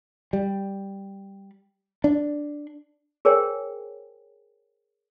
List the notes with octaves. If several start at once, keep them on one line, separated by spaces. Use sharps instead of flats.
G3
D4
G#4 A#4 C5 C#5 G5 G#5